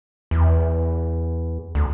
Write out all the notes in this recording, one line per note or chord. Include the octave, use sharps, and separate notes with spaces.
E2
D2